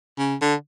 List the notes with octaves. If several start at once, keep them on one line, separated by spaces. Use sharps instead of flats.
C#3
D3